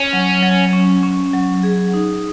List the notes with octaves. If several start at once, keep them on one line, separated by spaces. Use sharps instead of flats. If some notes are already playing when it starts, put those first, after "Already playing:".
Already playing: C#4
F#3
F#3
C#4
C#4
F#3
G#4
D#4